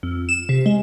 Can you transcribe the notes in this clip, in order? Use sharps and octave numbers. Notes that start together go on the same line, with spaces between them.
F2
E7
C3
G#3